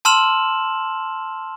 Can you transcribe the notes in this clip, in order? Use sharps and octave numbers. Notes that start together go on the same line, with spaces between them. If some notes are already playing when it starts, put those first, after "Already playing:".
A5 C6 E6 F6 E7 F#7